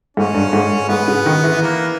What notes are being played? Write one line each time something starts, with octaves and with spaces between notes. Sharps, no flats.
G#2 C#4
G2
G#2
G#2 B3
C#3
D#3
E3
A#3